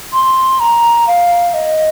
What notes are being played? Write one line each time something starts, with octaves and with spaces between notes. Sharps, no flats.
C6
A#5
F5
D#5